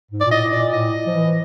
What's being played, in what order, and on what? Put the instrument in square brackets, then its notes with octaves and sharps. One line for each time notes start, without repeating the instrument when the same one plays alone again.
[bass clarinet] G#2
[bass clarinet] A#2 [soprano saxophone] D5
[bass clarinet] A2 [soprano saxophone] D#5
[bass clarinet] A#2 [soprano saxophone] D5
[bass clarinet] A2 [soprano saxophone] D#5
[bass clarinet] F3
E3